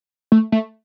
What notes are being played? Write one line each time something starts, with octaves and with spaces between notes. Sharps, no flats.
A3
A3